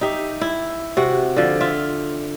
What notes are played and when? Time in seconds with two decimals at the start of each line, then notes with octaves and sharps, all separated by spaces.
0.01 D#4 G4 E5
0.41 E4
0.97 C3 F#4
1.37 D3 F3
1.61 F4 E5